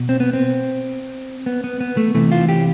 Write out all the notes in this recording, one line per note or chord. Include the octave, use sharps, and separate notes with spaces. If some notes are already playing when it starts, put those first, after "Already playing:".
Already playing: B2
C4
B3
C4
B3
B3
B3
A3
C3 E3 A3
F4
G4